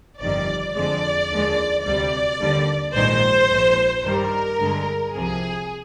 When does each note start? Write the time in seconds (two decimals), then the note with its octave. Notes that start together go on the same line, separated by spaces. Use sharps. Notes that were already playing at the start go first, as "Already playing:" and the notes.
0.20 G1 F2 D#3 G3 D5
0.75 F2 D3 F3 G#3 D5
1.30 D#2 D3 F3 G#3
1.85 D2 C3 G3 D5
2.39 D#2 D3 G3
2.94 A#1 G#2 D#3 G#3 C5
3.50 A#1 G#2 F3
4.04 G2 D#3 G3 A#4
4.59 G2 D3 G#3
5.14 C2 C3 F3 G#4